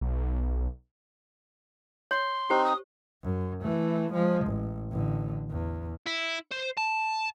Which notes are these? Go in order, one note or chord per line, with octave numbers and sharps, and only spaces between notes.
B1
C#5 C6
C4 D#4 G4 C5
D#6
F#2
E3 A3
F3 G#3
A1
A1 D3
E2
E4
C5
A5